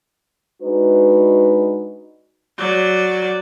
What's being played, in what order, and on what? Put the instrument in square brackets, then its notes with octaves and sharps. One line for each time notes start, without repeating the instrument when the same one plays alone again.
[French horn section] G#3 D4 D#4 F#4 B4
[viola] F#3 D5